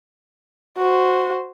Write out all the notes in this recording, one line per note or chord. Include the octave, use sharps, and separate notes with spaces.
F#4 C5